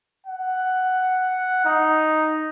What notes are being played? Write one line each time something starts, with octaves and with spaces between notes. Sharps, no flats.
F#5
D#4